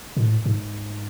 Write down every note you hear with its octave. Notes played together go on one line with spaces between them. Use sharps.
A2
G#2